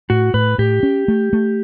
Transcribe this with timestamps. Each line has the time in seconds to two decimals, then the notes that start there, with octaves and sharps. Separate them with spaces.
0.10 A2 F#4
0.34 A2 B4
0.58 A2 G4
0.83 C#4
1.08 A3
1.33 A3